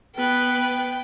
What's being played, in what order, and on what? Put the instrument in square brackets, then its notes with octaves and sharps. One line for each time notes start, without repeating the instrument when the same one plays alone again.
[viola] B3 B4 [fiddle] G5